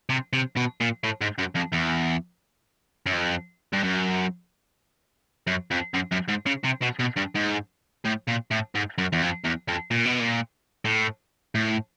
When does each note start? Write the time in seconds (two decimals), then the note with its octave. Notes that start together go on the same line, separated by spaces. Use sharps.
0.09 C3
0.33 C3
0.57 B2
0.81 A#2
1.04 A2
1.21 G#2
1.39 F#2
1.56 F2
1.73 E2
3.06 F#2
3.13 F2
3.73 G2
3.84 F#2
5.47 F#2
5.71 F2
5.94 F#2
6.12 F#2
6.29 G#2
6.46 C#3
6.64 C3
6.82 B2
6.99 B2
7.16 G2
7.35 G#2
8.05 A2
8.28 A#2
8.51 A2
8.75 G#2
8.98 F#2
9.13 E2
9.22 F2
9.44 E2
9.68 F2
9.91 A#2
10.05 B2
10.20 A#2
10.85 A2
11.55 A2